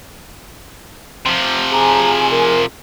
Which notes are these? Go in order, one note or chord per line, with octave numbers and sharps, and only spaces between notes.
C3 F3
G#4 G#5 A#5
A#4